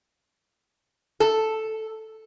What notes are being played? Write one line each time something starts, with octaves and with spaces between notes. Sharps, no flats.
A4